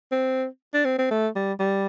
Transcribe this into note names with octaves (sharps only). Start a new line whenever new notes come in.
C4
D4
C4
C4
A3
G3
G3